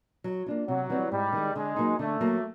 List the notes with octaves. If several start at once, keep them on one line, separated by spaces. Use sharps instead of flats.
F#3
A#3 D4 F4
C3 F#3
E3 G3 C4
G#2 G3
D#3 G#3
D3 G#3
F#3 A#3 D#4
D3 A3
F#3 A#3